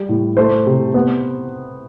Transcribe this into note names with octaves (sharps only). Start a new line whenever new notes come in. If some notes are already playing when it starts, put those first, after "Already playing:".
Already playing: G3
A2
A3 C5
C3
B3